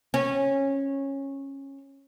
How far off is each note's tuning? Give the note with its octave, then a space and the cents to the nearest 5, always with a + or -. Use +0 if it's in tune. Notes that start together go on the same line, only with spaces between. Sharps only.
C#4 -15